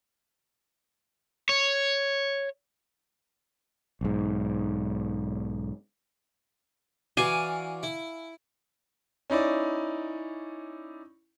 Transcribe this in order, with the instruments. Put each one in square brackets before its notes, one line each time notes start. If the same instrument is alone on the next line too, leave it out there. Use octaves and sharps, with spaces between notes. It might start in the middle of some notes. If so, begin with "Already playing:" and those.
[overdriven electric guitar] C#5
[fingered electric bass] B1 G#2
[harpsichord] E3 F#4 D5 [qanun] F5 G#5
[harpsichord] E4
[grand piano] C#4 D#4 E4 D5